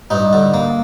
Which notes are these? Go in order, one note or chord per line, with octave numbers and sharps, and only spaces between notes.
G2 D#4
D3
A#3